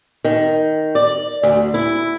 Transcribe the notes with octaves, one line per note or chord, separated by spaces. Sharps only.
D#3
D5
D2
E4